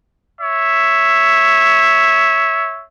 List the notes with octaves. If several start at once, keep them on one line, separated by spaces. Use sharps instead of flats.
C#5 E5